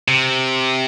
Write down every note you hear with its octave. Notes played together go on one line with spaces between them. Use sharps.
C3